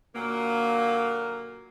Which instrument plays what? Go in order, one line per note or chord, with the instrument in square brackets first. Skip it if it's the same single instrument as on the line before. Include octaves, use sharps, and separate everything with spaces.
[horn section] A#2 D3 F#3 A#3